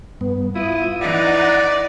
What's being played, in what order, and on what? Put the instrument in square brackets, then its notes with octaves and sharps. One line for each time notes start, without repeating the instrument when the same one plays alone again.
[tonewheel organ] G2 B3
[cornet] E4 [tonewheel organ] F4 D#6
[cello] E3 D#4 [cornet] D5 [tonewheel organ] F#5